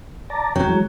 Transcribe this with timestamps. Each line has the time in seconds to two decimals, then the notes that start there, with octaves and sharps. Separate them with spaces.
0.30 D5 A5 A#5
0.56 F2 F#3 C#4 G5
0.67 E3 G#3